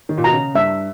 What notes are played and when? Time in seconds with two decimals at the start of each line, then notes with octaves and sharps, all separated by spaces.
0.09 D#3
0.18 A#2
0.24 B2 A#5
0.32 C#3
0.55 G2 E5